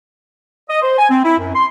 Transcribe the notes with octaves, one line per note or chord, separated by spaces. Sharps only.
D#5
C5
G#5
C4
E4
F#2
C6